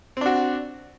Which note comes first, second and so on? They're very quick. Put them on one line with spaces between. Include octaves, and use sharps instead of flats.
C4 D4 F#4